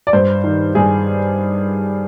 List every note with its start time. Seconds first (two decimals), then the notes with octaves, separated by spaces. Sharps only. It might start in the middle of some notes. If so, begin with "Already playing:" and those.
0.07 D5
0.13 G2 C5
0.44 D#3
0.75 G2 G#4